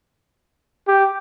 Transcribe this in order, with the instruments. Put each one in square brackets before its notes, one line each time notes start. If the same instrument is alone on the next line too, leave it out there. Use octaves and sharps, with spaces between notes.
[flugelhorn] G4